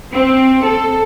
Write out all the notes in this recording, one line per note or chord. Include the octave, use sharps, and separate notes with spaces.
C4
A4